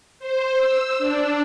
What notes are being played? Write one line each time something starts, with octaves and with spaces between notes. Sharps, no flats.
C5
E6
D4